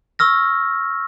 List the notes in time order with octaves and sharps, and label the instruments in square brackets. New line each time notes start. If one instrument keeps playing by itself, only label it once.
[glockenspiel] C#6 E6 F6 A#6